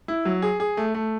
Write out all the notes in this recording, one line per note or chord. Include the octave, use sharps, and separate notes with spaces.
E4
F#3
G#4
G#4
A3
A3